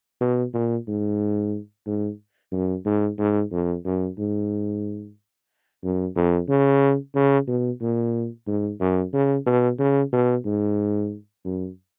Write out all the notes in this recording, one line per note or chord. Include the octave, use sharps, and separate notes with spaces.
B2
A#2
G#2
G#2
F#2
G#2
G#2
F2
F#2
G#2
F#2
F2
C#3
C#3
B2
A#2
G#2
F#2
C#3
B2
C#3
B2
G#2
F#2